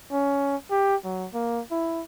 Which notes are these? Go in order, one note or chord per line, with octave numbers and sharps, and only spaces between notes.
C#4
G4
F#3
A#3
E4